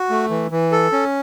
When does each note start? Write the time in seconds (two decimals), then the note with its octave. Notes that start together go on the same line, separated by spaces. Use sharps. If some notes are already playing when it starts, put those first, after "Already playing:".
Already playing: F#4
0.10 A3
0.30 E3
0.51 E3
0.72 A4
0.92 C#4